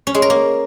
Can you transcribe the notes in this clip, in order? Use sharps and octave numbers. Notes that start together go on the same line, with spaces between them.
C#4
G#3
A#4
A#3